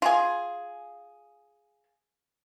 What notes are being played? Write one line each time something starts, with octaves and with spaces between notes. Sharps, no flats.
F4 G#4